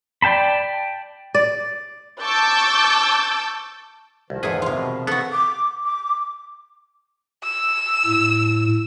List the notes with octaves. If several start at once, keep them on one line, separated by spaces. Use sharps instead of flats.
D5 G5 A5 B5
D5
A5 C#6 D6 E6 G6 A6
C2 D#3 F3
E2 G#2 G#4 A4 B4
C3 F4
B2
B3 F#4 A4
D6
D6
E6
A2